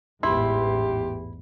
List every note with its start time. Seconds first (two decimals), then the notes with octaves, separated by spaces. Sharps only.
0.23 A1 E2 G#2 E4 G4 C6